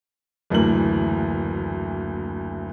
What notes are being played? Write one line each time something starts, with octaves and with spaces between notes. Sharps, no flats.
F#1 D2 E3 A#4 F#7